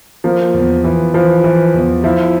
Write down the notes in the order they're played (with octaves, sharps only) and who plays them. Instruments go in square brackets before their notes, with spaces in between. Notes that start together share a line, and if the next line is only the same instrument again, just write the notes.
[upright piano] F3 [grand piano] A#3
[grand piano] E2
E3
[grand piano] E3 [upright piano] F3
[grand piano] E3
E2
[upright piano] F3 [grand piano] E4